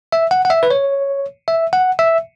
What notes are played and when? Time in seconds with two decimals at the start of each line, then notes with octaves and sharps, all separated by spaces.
0.12 E5
0.31 F#5
0.45 F#5
0.50 E5
0.63 B4
0.71 C#5
1.48 E5
1.73 F#5
1.99 E5